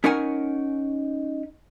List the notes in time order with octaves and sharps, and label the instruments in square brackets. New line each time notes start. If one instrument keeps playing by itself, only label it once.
[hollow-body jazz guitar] C#4 D#4 A#4 C#5 F#5 G#5